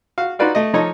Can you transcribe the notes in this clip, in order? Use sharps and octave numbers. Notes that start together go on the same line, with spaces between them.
F#4 F5
D#4 F4 F#4 B4 D5 F5
A3 D#5
F3 D#4 A4 C#5 D#5